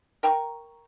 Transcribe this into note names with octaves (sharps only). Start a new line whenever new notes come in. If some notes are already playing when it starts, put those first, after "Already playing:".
A#4 G5 A#5 C#6